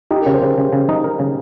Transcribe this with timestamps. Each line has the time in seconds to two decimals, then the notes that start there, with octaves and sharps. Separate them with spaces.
0.10 D#4 G4
0.22 C#3 A#4
0.34 C5
0.42 C#3
0.58 C#3
0.73 C#3
0.89 D#4
1.04 A#4
1.19 C#3